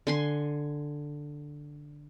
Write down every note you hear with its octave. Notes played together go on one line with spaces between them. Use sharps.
D3 G#5 C6